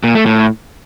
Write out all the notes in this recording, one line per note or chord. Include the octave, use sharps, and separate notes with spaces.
A#2
A3
A2